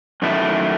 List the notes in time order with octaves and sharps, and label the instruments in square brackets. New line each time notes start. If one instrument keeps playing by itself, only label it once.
[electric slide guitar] F#2 D#3 A3 E4